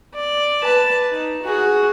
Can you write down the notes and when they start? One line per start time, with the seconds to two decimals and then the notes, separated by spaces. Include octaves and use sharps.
0.14 D5
0.63 B4 A5
1.11 D#4
1.42 F#4 G#4